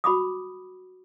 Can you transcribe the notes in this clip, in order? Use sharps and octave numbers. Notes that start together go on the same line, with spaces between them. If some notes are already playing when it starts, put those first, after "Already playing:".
F#4 B5 D6 D#6